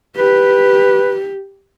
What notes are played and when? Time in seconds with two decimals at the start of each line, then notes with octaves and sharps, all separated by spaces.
0.17 G4 B4